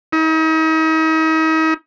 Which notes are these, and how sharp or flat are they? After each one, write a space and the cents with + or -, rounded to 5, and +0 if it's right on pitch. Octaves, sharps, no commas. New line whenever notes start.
D#4 +40